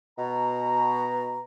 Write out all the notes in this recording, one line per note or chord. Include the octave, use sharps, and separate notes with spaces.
B2 A#5